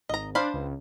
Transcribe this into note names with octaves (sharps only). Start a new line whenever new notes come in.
G#1 D#5 A#5
D4 C5 F5 B5
C#2